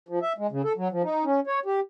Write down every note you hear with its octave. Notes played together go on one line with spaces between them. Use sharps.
F3
E5
G#3
C#3
A4
F#3
F3
D#4
C#4
C#5
G4